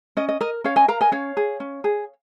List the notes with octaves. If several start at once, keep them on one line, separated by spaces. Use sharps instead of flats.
C#4 D#5
D#5
A#4 D#5
C#4 C#5 F5
D#5 G#5
A#4 F5 A#5
D#5 G#5
C#4 C#5 F5
G#4
C#4
G#4